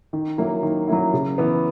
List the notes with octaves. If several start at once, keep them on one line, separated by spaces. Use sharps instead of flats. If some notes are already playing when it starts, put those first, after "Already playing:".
D#3
F#3 A#3 E4
D#3
F#3 A#3 E4
C#3
E3 B3